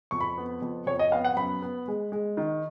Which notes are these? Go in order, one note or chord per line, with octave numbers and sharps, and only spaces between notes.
F2 C#6
B5
B3
F2
F2 C#5
D#5
B3 F5
F#5
F#2 B5
B3
G#3
G#3
D#3